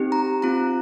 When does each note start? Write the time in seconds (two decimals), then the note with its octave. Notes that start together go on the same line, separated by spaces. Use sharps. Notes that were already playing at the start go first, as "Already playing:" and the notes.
Already playing: C4 D#4 G4
0.12 A#5
0.42 C4 F4 A#5